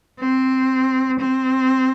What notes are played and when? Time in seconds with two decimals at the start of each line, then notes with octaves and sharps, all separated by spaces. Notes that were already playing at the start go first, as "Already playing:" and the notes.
0.20 C4
1.20 C4